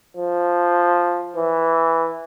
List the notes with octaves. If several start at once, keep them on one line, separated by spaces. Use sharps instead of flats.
F3
E3